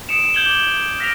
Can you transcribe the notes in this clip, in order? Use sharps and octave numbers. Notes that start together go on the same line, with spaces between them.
D#6 C#7 D7 E7 F7
G6 G#6 F#7 G7
D6 G#6
F6 A#6 B6 D7 F7